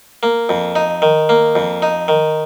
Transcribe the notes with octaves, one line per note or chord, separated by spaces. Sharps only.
A#3
F2
D#4
D#3
A#3
F2
D#4
D#3